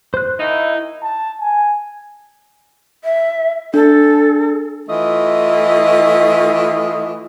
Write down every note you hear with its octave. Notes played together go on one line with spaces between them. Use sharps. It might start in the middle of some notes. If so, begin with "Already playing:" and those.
C5 C6 F#6
D#2 D#3 D#4 E4
A5
G#5
E5
D4 A4
E3 A3 F4 D#5